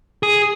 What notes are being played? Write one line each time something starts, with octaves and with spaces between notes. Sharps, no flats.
G#4